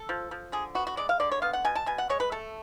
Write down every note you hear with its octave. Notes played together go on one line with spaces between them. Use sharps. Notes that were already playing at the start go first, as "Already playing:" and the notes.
Already playing: A4
F3
F3
D3 G#4
B3 F#4
F#4
G#3 D5
F5
D3 D5
C#5
B3 F5
F#5
B2 G#5
A5
B2 G#5
F#5
G#3 C#5
B4
A3 A4